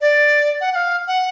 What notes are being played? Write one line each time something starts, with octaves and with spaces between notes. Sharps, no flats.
D5
F#5
F#5
F5
F#5